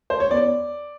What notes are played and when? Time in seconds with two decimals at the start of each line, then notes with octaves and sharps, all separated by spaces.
0.10 C5
0.20 C#5
0.31 E2 D5